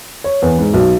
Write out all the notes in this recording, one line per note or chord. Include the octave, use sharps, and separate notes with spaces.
C#5
E2
G#2
B1